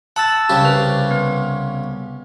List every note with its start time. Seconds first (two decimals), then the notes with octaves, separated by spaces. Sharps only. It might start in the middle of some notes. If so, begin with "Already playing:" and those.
0.16 F#5 A5 E6 A6
0.49 C2 C#3 G4
0.65 B4
1.11 B3